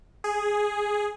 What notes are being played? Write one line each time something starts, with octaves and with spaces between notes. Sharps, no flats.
G#4